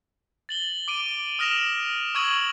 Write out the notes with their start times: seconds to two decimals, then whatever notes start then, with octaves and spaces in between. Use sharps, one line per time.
0.49 A6 F#7 G7
0.88 D6 D7 D#7
1.39 D#6 F6 A#6 E7 F7
2.15 C#6 D#6 E6 G#6 D#7 F#7